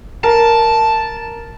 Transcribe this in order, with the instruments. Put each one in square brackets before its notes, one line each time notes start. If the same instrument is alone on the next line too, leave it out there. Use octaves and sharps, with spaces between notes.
[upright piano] A#4 [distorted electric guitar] A5